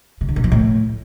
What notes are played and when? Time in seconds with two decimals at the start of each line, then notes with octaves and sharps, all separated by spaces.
0.21 C#3
0.29 D3
0.36 A#2
0.44 F3
0.52 A2